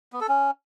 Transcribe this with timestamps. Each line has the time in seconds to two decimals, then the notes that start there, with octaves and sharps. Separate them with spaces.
0.13 B3
0.21 A4
0.29 C#4